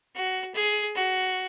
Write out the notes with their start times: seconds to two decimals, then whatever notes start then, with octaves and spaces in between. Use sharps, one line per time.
0.15 F#4
0.55 G#4
0.95 F#4